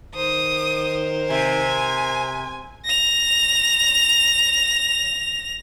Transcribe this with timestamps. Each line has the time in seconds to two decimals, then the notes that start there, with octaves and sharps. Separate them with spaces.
0.15 D#3 A#4 C5 D#6
1.30 C3 G#5
2.85 A#6 F7